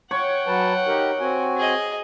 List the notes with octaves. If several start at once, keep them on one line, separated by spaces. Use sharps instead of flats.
C#5 F#5 G5
F#3 B4 A5
D#4 G4 A#4
C4 F#4 G#5
G#4 D#5